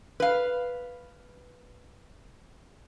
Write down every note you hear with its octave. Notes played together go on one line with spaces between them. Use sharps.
B4 F5